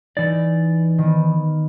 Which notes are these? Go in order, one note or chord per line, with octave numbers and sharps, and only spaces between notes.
E3 D#4 D5
D#3 B3